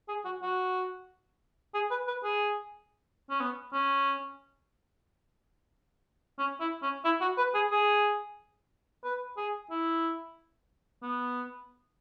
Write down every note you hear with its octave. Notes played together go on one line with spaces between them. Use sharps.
G#4
F#4
F#4
G#4
B4
B4
G#4
C#4
B3
C#4
C#4
E4
C#4
E4
F#4
B4
G#4
G#4
B4
G#4
E4
B3